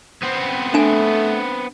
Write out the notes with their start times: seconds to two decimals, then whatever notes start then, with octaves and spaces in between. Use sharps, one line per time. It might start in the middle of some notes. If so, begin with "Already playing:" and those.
0.22 B3 C4
0.74 A3 D4 G#5